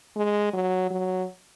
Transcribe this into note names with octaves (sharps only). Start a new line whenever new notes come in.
G#3
F#3
F#3